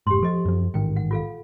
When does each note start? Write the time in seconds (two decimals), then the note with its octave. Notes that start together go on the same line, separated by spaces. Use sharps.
0.07 F1 G#2 G4 C6
0.23 F3 A4 D#5
0.45 F#2 F3
0.74 A1 G#2 D#3 G5
0.96 F#5
1.11 F4 A4 F5